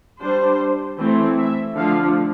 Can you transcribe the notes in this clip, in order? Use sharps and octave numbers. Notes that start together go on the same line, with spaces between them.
G3 D4 C5
E3 A3 C4 E4
E5
D3 F3 A3 F5